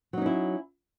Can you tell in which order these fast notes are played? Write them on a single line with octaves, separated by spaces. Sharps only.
F#3 D#4 C#4 E4